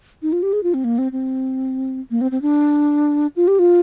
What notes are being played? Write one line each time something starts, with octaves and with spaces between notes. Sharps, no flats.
D#4
F4
G4
G#4
F4
C4
A#3
C4
C4
A#3
C4
C4
D4
F4
G4
F4